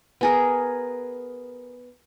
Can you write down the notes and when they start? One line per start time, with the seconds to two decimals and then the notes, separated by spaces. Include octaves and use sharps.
0.21 B3 G#4 A#4